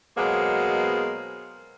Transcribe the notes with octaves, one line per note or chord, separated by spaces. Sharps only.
B2 F#3 G#3 A#3 B3 C5